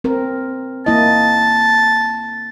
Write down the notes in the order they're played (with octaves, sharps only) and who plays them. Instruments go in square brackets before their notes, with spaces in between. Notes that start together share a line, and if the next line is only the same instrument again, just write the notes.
[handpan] C4 A#4
[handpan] A#3 E4 D#5 [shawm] A5